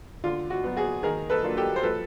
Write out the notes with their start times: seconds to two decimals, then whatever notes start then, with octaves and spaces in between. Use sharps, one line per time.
0.24 D3 F4
0.50 F#4
0.64 F#3 B3
0.76 F#4 G#4
1.03 D#3 G#4 A#4
1.30 A4 B4
1.43 F#3 A#3 D4 F4
1.57 G4 A4
1.76 C5
1.83 F3 A4 B4